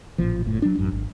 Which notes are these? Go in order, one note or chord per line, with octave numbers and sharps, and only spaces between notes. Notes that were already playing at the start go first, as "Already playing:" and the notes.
A1 A#2 F3
F#1 A2
F#3 D4
A1 F#2
G#1